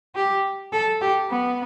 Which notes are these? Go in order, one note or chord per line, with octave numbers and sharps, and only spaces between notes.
G4
A4
G4
B3